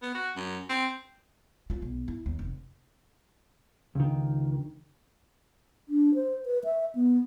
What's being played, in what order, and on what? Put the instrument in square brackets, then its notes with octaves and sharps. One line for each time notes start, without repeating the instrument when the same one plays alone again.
[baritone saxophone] B3
F#4
F#2
C4
[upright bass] C#4 F4
B1
E4
D#2
F1
[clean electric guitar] C#2 D#3
[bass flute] D4
C5
B4
E5
B3